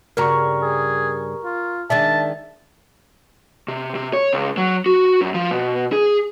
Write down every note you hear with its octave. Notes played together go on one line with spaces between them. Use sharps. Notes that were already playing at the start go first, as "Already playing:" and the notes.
G2 C#3 F#4 A#4 A#5 C#6
G#4
F4
D#3 G#3 D4 E5 A5
C3
C3
C#5
C#2
F#3
F#4
F#2
F3
B2
G#4